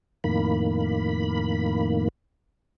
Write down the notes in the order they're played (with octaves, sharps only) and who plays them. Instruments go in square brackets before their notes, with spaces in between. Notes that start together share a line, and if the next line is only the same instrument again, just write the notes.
[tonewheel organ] F2 A2 D#3 A#3 B5